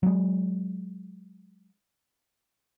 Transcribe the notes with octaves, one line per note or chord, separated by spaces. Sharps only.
F#3 G#3